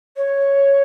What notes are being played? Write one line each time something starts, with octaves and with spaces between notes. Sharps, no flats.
C#5